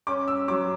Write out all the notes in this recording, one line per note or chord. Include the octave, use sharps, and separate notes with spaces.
C#4 D6
E6
F#3 D6